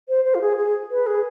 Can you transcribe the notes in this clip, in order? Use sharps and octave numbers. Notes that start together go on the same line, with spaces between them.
C5
C5
F4
G#4
G#4
B4
G#4